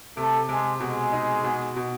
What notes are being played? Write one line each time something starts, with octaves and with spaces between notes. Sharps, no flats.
C3 A3 A4
C3 G#3 G#4
B2 G#3 G#4
D#4
B2
B2